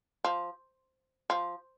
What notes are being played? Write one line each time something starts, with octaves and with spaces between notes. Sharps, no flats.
F3
F3